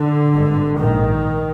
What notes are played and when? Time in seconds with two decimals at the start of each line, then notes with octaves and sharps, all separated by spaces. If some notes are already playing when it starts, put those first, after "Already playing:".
Already playing: D3
0.34 G#1 G2
0.80 A#1 G#2 D#3